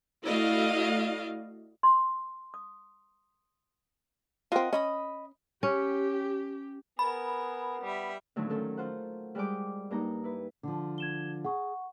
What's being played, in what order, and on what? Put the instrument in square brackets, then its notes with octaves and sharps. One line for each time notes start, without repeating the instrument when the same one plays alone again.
[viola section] A3 E4 F#4 D5 D#5 F5
[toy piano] C6
D#6
[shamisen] C4 F4 [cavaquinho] A#4 D#5 F#5
[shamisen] C#4 [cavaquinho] D#5 B5 D#6
[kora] C#4 [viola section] G4
[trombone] B3 [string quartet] G#4 A#4 [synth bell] B5
[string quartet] G3 E5
[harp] A2 D3 D#3 F3 F#3 A3
D#3 A3 C#4 A4 A#4
F4 C5 F#5
G3 G#3 G4 D5 D#5 D6
G2 A#3 D#4 A#5
E4 B4
[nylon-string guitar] D3 F3
[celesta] G#6 E7 G7
[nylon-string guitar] G#4 [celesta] F#5 C#6